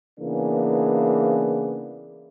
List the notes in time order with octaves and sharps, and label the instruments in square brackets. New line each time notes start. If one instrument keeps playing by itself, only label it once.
[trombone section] C#3 E3 A#3 B3 D4 G#4